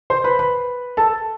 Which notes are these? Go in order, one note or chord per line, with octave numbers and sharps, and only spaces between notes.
C5 C6
B4 B5
B4 B5
A4 A5